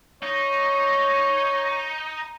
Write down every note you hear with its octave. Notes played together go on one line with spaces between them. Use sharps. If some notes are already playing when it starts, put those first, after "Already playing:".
D#4 C#5